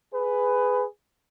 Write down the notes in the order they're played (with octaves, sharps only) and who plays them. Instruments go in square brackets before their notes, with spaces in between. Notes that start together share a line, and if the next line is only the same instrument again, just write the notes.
[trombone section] G#4 B4